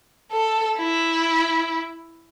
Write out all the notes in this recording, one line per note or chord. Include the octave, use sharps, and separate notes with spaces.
A4
E4